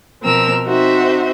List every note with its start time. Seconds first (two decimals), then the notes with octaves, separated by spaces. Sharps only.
0.22 B2 F3 C4 A#4 E6
0.66 C4 D#4 F#4 C5 E5